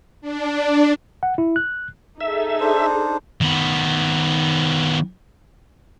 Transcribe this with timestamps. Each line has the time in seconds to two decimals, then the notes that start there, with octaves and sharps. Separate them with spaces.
0.21 D4
1.23 F#5
1.38 E4
1.56 F#6
2.21 D#4 G#4 A4 E5
2.60 D4 C5
3.41 D#3 B3